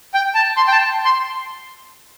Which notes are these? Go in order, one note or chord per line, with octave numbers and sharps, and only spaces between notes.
G5
A5
C6
G5
A5
C6